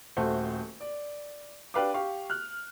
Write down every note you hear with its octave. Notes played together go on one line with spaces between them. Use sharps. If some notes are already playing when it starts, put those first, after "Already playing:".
D#1 A3 F#4 C5
D5
D4 G4 B4 F5 G5 D6
G4 F5 C#6
F6 F#6